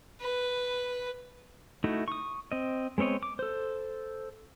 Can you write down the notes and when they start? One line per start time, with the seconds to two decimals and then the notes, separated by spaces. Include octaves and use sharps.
0.21 B4
1.84 A3 D#4 E4 F#4
2.08 C#6 D#6
2.52 C4 D#5
2.98 G#3 B3 C4 C#5 D#5
3.23 D6
3.39 A4 C5